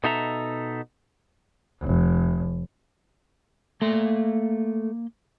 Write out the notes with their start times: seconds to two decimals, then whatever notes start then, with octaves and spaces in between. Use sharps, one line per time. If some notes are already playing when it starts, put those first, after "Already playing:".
0.04 B2 D#4 A4 E5 A#5
1.81 F1
3.82 A3 A#3 C6